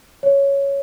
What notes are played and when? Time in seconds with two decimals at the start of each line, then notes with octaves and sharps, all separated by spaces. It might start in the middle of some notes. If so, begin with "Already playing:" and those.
0.23 C#5